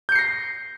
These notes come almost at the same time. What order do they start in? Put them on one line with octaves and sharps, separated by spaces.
G6 C#7 C7 A#6